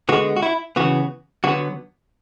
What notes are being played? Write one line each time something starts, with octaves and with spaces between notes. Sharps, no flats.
D3 G#3 B3 F#4
F#4
E4
C#3 E3 B3 F#4
D3 F#3 B3 F#4